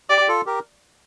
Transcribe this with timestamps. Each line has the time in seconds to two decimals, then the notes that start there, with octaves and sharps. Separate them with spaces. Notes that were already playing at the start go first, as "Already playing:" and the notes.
0.10 G4 D5
0.21 G4
0.28 F4 A4
0.46 G4 A#4